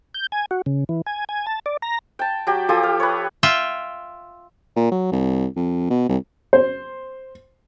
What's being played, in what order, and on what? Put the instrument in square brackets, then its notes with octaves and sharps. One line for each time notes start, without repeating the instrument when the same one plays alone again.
[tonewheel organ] G6
G#5
F#4
C#3
E3
G#5
G#5
A5
D5
A#5
[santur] G5 A5
F#3 G4 G5
F3 G4 A4 D#6
F5
B4 C#5
[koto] F4 E5 G5
[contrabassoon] A#2
F#3
C2
F2
B2
C2
[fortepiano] C5